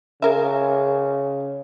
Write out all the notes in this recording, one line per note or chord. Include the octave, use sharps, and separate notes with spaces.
C#3 G#4 A#4 E5